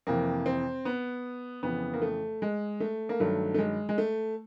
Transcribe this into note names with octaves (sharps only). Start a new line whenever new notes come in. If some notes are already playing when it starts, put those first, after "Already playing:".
F2 C3 E3 A#3
C4
B3
F2 C#3 E3 B3
A#3
A3
G#3
A3
A#3
G2 D#3 F#3 A3
A3
G#3
G#3
A3